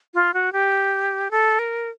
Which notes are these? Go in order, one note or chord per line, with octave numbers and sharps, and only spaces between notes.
F4
F#4
G4
A4
A#4